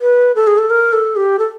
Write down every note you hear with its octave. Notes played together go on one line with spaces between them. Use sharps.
B4
A4
G#4
A4
A#4
A4
G4
A4